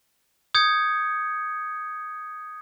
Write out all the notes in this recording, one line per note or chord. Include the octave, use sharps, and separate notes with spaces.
D#6 G6 G#6 C#7